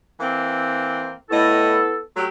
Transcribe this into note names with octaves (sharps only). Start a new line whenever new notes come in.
E3 A#3 C4
A2 B3 E4 A4 C#5 D#5
F#3 A3 G4